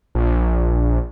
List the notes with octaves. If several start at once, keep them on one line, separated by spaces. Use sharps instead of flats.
A#1